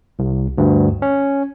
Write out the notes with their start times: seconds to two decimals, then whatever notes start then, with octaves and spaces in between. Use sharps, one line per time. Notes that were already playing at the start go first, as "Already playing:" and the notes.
0.19 C2
0.58 D2 G2
1.02 C#4